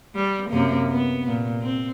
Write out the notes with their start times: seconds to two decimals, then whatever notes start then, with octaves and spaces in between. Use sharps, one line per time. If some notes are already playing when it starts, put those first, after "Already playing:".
0.16 G3
0.50 F#2 C3 A#3
0.90 B3
1.26 A#2
1.62 C4